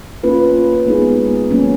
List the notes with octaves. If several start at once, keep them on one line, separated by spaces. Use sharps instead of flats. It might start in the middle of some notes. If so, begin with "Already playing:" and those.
A#3 C#4 F4 B4
G#3 B3 D#4 G#4
F#3 A#3 C#4